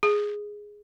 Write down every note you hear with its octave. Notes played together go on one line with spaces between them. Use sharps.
G#4